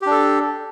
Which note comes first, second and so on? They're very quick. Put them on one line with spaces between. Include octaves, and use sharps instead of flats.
G4 D4 A4